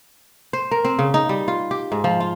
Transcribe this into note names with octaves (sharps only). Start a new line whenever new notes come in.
C5
A#4
C4
C#3
D#4
G3
F4
G4
G#2
F3
F4